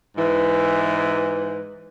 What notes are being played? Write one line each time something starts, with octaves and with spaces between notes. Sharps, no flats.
G#2 E3